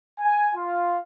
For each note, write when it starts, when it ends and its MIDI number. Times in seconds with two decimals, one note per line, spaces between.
0.20 0.50 80
0.54 0.96 65